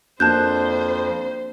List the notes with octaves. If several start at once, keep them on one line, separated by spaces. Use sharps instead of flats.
F2 A#3 D4 F#4 C5 A5 F#6 G6